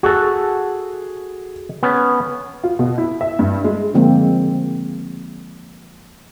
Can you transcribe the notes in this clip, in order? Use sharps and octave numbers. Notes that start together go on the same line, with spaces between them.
F#4 G#4 A4
B3 C#4
F4
B2
E4
E5
G2
G#3
D3 F3 G#3 A#3 C4